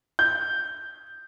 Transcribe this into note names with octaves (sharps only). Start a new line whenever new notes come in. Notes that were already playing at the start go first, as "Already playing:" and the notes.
G6